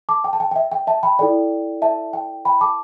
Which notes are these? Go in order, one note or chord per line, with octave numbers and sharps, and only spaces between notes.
A5 D6
G5
A5
G5
G5
E5
G5
E5 A5
G5 B5
E4 A4 D5 G5
E5 A5
G5
G5 B5
A5 D6